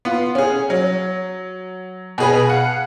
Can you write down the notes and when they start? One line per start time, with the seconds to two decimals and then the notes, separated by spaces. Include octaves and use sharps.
0.05 B3 F4
0.35 C#4 G#4
0.70 F#3
2.18 B2 G#4 B4
2.48 F5 F#5